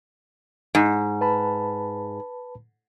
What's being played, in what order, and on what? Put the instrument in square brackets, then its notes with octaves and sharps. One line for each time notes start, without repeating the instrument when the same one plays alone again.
[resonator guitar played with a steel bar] G#2
[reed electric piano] B4 A5 B5